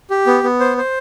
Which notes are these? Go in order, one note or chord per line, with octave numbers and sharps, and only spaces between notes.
G4
B3
B3
C5
C5